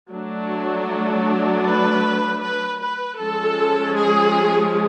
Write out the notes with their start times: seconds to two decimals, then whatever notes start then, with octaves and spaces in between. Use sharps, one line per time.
0.10 F#3 A3 D4
1.65 B4
2.41 B4
2.80 B4
3.18 F3 G#3 C#4 A4
3.95 G#4